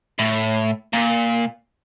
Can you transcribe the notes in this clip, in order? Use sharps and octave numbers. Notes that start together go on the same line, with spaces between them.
A2
A#2